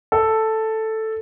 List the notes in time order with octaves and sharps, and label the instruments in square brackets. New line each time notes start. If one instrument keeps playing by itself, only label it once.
[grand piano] A4